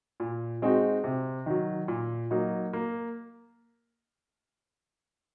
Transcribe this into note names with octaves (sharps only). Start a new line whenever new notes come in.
A#2
G#3 C4 D#4 F#4
C3
D#3 F#3
A#2
F#3 A#3 D#4
A#3